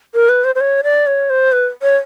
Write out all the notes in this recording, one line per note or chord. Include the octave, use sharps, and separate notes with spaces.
A#4
B4
C5
C5
C#5
D5
C#5
C5
B4
C#5